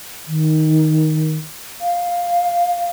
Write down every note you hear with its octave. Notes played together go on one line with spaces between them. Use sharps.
D#3
F5